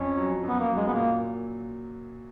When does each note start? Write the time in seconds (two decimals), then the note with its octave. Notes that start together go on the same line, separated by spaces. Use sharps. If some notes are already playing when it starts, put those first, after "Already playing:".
Already playing: F2 C#4
0.18 F#3
0.43 F#2 B3
0.59 A#3
0.69 F#3
0.76 G#3
0.87 B3
0.93 A#2 A#3